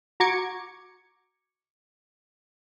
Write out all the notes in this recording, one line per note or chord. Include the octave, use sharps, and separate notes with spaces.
F#4 A#5 C#6 D6 G#6 C#7